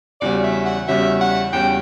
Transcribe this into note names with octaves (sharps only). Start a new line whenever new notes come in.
E2 C#3 G3 C#4 F#4 D5
E5
F#5
E2 C#3 G3 C#4 F#4 E5
F#5
E2 C#3 G3 C#4 F#4 G5